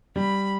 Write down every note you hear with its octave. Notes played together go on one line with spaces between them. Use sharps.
G3 B5